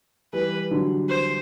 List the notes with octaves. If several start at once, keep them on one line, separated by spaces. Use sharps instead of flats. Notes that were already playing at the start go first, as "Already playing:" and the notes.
E3 G3 B4
D3 F#3
C5